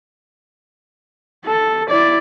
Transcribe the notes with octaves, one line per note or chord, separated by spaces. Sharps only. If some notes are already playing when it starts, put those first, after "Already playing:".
A4
E4 D5